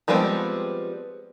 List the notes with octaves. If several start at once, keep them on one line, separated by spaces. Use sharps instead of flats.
F3 G3 G#3 B3 C4